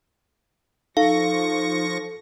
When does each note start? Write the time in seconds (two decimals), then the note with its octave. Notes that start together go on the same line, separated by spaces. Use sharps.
0.97 F3 D#4 A4 F5 C#6 A#6